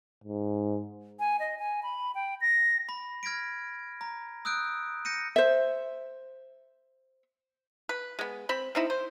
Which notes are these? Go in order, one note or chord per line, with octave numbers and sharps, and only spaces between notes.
G#2
G#5
D#5
G#5
B5
G5
A#6
B5 A#6
F6 G#6 A#6 B6 D7
A#5
D#6 E6 F#6 G6 D7
G6 A#6 C#7 D#7
C5 E5
B4
G#3 B3
C4 B5
C4 D#4 E4
C5